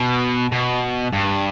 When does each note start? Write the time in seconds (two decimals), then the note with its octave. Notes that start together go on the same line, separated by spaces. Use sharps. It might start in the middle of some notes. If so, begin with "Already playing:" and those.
Already playing: B2
0.52 B2
1.13 G2